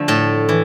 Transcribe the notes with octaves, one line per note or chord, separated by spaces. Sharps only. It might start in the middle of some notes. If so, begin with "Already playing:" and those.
Already playing: D3 F3 A3
A2 A4
E3